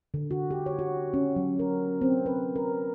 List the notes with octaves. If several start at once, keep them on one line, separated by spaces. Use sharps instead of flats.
D3
F#4
G4
C#5
F#4
C#4
F#3
A#4
C4
B4
A#4